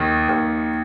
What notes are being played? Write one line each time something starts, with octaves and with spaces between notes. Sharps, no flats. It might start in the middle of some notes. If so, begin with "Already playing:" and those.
Already playing: D#2 D#3
D#2